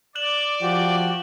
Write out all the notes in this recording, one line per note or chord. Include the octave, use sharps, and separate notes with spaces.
D5 F#6 E7 F#7
F3 F#4 G4